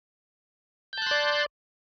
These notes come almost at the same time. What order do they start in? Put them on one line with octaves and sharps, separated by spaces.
G6 A5 F#6 C6 D5